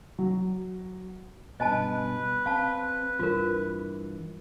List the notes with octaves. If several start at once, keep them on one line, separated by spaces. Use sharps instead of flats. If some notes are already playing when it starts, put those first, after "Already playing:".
F#3
G2 B2 B4 D#5 G#5 A5
C4 F5 A5
G2 E3 F4 A#4